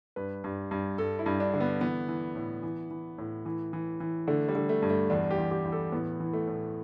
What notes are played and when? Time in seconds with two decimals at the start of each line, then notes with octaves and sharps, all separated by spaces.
0.16 G2 B4
0.44 G2
0.71 G2
0.98 G2 A4
1.19 E4
1.26 G2
1.40 D4
1.54 D3
1.60 B3
1.81 E3 B3
2.08 E3
2.36 A2
2.63 E3
2.91 E3
3.18 A2
3.46 E3
3.73 E3
4.00 E3
4.28 D3 A3
4.48 G3
4.55 D3
4.69 A3
4.82 G2
4.90 A3
5.10 E2 D4
5.30 G4
5.38 E2
5.51 G4
5.65 E2
5.72 A4
5.92 A2 B3
6.20 E3
6.33 A3
6.47 A2